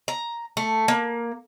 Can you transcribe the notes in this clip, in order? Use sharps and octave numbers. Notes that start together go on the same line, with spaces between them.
A#5
A3
A#3